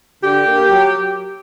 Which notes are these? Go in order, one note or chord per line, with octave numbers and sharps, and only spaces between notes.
D3 G4
A#3
F#3